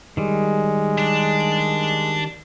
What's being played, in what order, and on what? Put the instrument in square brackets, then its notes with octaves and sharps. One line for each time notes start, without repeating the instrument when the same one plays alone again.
[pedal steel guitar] D#3 G3 [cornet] G#3
[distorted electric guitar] D4